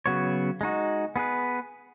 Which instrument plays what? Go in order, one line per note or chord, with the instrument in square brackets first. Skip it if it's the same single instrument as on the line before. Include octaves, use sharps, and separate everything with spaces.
[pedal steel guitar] C#3 F#3 B3 F#4 C#5
G#3 D#4 F#4
B3 G#4 B4